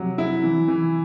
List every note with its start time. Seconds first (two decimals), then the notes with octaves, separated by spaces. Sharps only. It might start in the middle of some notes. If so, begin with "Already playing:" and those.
Already playing: C3 F#3
0.18 E4
0.43 E3
0.68 E3